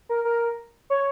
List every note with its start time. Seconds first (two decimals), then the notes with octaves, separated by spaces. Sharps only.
0.09 A#4
0.25 A#4
0.90 C#5